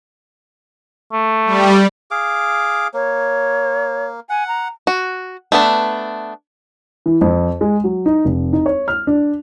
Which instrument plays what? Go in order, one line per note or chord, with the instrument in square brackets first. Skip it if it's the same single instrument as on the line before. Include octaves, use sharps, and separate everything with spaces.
[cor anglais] A3
[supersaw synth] G3
[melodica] G#4 F5 D6
[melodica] A#3 [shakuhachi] C#5
[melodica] F#5 [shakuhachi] G#5
[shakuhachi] A#5
[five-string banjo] F#4
A3 B3 D4
[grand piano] E3
F2
G#3
F#3
D#4
F1
D#4
C#5
F6
D4